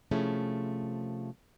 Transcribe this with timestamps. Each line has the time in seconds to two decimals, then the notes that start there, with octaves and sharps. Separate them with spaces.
0.11 C3 F3 A3 C#4 E4 G#4